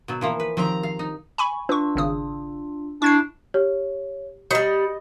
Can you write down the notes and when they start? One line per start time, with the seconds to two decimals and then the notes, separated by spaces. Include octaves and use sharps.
0.08 B2 F#3
0.21 E3 F3 A#3
0.40 B4
0.57 D#3 F3 C4 G4 A#5
0.83 F5
0.99 D#4
1.38 G#5 B5 C#6
1.69 D4 F4 B4 C#6 E6
1.96 G#1 C#3 D#6
3.02 D4 E4 C#6 G#6 C7
3.54 G4 C#5
4.51 F#3 G3 D#5 G6 C#7